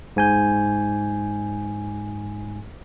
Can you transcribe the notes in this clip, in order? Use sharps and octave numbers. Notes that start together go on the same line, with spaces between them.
G#2 G#5 G6